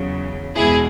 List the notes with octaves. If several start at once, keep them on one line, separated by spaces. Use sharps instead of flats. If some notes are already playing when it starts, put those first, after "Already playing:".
Already playing: E2 C#3 F#3
E2 B2 G#3 E4 G#4